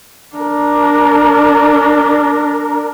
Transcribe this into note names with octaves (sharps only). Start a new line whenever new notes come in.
D4 A#4